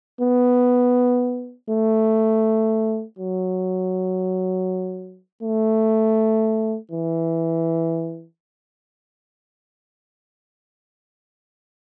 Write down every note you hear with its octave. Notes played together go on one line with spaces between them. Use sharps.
B3
A3
F#3
A3
E3